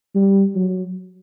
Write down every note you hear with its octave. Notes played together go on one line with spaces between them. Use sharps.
G3
F#3